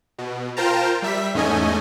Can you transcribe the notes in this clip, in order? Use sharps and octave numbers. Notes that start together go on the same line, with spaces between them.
B2
F4 A#4 C5 G5 A5 A#5
G3 E5 B6
E2 G#2 A3 C#4 D#5 G#5